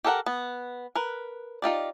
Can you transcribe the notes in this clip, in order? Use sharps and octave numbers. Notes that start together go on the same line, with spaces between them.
G4 A4 A#4 F#5
B3
A#4 B4
D#4 F4 G4 D5